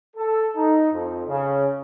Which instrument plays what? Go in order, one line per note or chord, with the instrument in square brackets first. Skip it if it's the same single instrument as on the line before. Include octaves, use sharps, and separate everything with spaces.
[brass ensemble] A4
D#4
F2
C#3